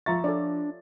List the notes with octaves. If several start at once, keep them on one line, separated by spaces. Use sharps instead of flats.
F3 F4 E5 A#5 C#6 A6
D4 A4 C#5 D5